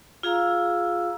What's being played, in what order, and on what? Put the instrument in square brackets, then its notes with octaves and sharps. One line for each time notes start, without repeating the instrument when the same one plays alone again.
[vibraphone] F4 G#4 F5 A#5 E6